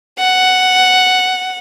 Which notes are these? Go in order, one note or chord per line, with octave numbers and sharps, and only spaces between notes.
F#5